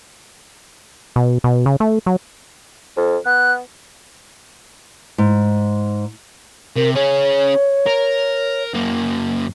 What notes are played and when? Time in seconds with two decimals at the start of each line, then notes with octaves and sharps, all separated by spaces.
1.16 B2
1.44 B2
1.66 C#3
1.80 A3
2.06 F#3
2.97 F2
3.26 B3 F#6
5.18 G#2
6.76 C3 A#4
6.95 C#4 G#4 C#5
7.86 A#4
8.74 F#2 A#3